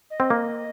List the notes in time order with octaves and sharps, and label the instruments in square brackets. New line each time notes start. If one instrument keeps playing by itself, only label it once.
[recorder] D#5
[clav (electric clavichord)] C4
A#3